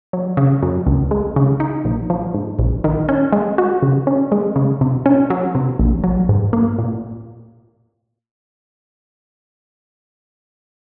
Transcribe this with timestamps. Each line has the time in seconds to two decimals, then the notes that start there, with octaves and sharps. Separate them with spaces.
0.13 F#3
0.37 C#3
0.63 F#2
0.87 C#2
1.11 G#3
1.36 C#3
1.60 D#4
1.85 A#1
2.10 F3
2.34 G#2
2.59 A#1
2.84 D#3
3.09 C#4
3.33 G#3
3.58 F#4
3.82 C#3
4.07 C#4
4.32 G#3
4.56 C#3
4.81 C3
5.06 C#4
5.30 F#3
5.55 C3
5.79 A#1
6.04 F#3
6.29 G#2
6.53 A#3
6.78 A#2